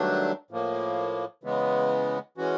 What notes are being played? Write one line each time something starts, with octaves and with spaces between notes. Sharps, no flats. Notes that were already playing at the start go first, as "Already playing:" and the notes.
Already playing: G2 D#3 F#3 A3 D4
A2 F3 A#3
C#3 E3 G#3 B3
E3 G#3 C#4 F#4